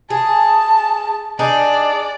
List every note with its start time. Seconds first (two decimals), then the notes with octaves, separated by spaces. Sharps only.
0.10 G#4 A5
1.39 D4 D#4 G#4 D5